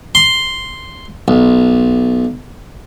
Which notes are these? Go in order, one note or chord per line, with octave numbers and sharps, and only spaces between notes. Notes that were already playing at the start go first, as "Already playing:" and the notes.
C6
B1